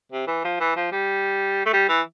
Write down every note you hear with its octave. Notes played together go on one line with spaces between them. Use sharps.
C3
E3
F3
E3
F3
G3
A3
G3
E3